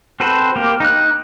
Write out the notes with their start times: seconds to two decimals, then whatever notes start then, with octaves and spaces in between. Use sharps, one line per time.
0.20 C4 F#4 A4 B4 C5
0.56 A#3 G4
0.80 D#4 F#6